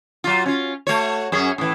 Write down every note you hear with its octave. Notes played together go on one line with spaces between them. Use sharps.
F#3 F4
C#4 F4
A3 F#4 C#5
F#2 C#4 G#4
A2 E3